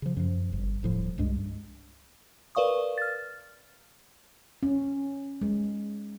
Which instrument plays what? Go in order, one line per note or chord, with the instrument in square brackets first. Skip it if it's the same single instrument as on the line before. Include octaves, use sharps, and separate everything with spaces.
[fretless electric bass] C#3 F3
F#2 F3
D1 G1
D#1 A2 F3
C2 G2 G#3 D4
[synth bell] A#4 B4 D5 F5 C#6 D#6
F6 A6
[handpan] C#4
G#3